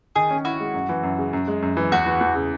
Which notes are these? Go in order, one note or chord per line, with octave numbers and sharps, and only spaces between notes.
D#3 G#4
C#4
E4 F#4
G#3
F#2
E3
F#2
C#3
F#2
G#3
F#2
E3
E2 F#4
E3
E2
C#3